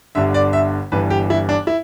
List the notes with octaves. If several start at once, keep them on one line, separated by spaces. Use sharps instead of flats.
G1 G2 D3 E5
D5
E5
G1 G2 E3 G3 B4
G4
E4
D4
E4